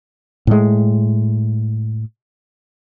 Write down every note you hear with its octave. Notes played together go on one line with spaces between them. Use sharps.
A2 G#3